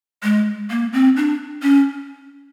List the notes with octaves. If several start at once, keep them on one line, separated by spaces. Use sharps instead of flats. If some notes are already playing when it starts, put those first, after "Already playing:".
G#3
A#3
C4
D4
C#4